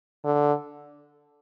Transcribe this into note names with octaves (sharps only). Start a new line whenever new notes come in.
D3